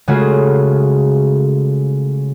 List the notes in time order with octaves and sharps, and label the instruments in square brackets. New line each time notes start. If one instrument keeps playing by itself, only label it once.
[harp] C#3 G#3 A3 F4 F#4 G#4